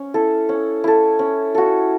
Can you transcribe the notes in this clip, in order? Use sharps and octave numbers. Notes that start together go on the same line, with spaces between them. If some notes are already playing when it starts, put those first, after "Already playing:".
Already playing: C#4
E4 A4
C#4
E4 A4
C#4
F#4 A4